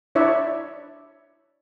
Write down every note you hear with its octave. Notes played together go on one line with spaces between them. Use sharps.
D4 E4 C#5 D5 E5